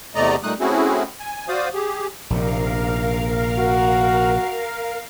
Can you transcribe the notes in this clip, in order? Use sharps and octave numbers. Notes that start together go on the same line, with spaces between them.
E2 C3 A3 D5 D#5 A#5
A#2 G3 A3 D#4 D#6 F#6
A3 C4 C#4 E4 F#4 G#4
G#5
F#4 C5 D5 F5 D#6
G4 G#4
A#1 C3 A#4 F5
F#4